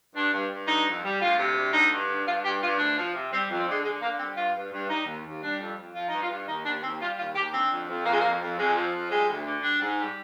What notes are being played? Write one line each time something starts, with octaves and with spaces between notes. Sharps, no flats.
G2 D4
G2
G2
D3 D#4
F2
G3
D2 F4
C3
D2
D3 D#4
G2
D3
G2 F4
G2 G4
G2 F4
D2 D4
F3
C3
G3 C4
F2
C4
D3 G#3
D3 G#3
D3 A#3
G3 C4
G2 F4
G2
G2
G3 D#4
D#2
D#2
G3 D4
F2
F2
F3 F4
D#4
G2
F4
G2
D#2 D#4
D#2 D4
D#2 C4
G3 F4
D#2 F4
D#2 G4
D3 C4
F2
F2
F2 A#3
G#3
F2 A#3
F2
F2 G#3
F3
F2
G3 G#3
D2
D3
G3 D4
G#2
G3